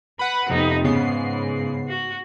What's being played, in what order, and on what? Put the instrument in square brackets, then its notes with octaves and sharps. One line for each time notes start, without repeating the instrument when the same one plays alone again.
[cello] B4 [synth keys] F#5 B5
[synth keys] F2 C3 [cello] B3 D#4
[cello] G#2 [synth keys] C#3 B3 C7
[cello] F#4